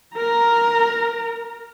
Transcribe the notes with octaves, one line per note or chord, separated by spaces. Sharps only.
A#4 A#5